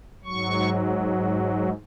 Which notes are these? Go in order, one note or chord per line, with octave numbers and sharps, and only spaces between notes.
G#2 F#3 C#6